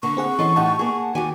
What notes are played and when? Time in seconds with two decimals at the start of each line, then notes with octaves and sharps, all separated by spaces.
0.03 D3 A#3 C#6
0.17 C4 G#4 F#5
0.39 E3 C#4 A4 D#5 C6
0.56 A2 D#4 G4 F#5 A5
0.79 A#3 G#4
1.15 D#2 D#3 F#4 G4 G#5